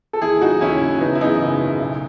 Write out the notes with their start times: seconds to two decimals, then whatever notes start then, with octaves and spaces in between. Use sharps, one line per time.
0.13 A4
0.21 D#2 E4 G#4
0.41 C#3 F#3 D#4 F#4
0.61 D#2 C#4 E4
0.81 C#3 F#3
1.00 F#1 B3 D#4
1.15 E4
1.21 F#2 C#3 B3 D#4
1.41 F#1
1.60 F#2 C#3
1.81 B1